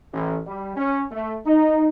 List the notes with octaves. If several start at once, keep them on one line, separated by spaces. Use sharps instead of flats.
A1
G3
C#4
A3
D#4